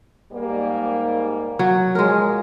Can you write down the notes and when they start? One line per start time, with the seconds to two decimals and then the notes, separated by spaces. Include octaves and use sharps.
0.32 G#2 G3 A#3
1.59 F#3
1.95 A#2 F3 G#3 A#4 C#5